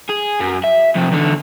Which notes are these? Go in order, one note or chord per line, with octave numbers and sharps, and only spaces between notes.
G#4
F#2
E5
F2 C3
E2 D3